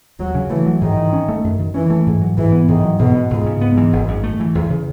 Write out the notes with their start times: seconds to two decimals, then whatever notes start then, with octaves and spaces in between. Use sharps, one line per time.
0.19 D#2 F#3
0.35 C#3
0.50 E3 A3
0.66 F#3
0.81 G#2 D#3
0.97 E3
1.13 C#4
1.29 A3
1.44 F#2
1.59 D#3
1.74 E3 C#4
1.90 A3
2.07 G#2
2.21 F#3
2.37 G#2 E3
2.52 B3
2.68 G#2 D#3
2.84 F#3
2.99 G#2 B2
3.15 B3
3.30 C#2 G#2
3.46 C#3
3.61 G#2 B3
3.77 E3
3.93 G#1
4.08 F#2
4.24 A3
4.40 E3
4.55 E2
4.70 C#3